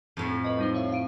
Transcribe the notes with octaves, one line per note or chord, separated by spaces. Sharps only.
F2 A2
B4 D#5
G3 D#4 C5
C#5 E5 F5
F5 D7 D#7